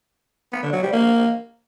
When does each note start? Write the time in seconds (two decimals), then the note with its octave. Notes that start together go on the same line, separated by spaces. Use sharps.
0.52 B3
0.63 D3
0.73 F#3
0.83 G3
0.93 A#3